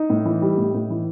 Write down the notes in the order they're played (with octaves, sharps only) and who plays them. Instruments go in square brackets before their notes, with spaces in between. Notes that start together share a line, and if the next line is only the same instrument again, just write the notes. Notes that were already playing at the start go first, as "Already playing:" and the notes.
Already playing: [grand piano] D#4
A2
E3
G3
A2
A2
E3